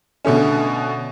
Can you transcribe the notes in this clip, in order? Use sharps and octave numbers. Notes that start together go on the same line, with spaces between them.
B2 D3 A3 C#4